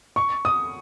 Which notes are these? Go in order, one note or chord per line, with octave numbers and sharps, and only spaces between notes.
C#6
D#6